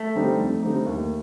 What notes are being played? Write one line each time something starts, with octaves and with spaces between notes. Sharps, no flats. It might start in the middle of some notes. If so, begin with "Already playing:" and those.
Already playing: A3
D3 G3 C4 D#4
F2
D3 G3 C4 D#4
D#2